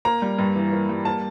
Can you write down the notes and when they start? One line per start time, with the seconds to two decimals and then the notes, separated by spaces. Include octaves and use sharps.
0.05 A#3 A#5
0.22 G3
0.39 G2
0.55 E3
0.73 A#3
0.89 G3
1.05 A#3 A5